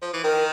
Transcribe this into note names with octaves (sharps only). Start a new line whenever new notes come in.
F3
E3
D#3 A#4